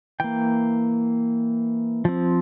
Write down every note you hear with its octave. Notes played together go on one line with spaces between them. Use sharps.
E3 A#3 G5
F3 C4